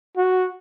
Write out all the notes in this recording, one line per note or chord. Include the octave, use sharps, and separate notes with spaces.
F#4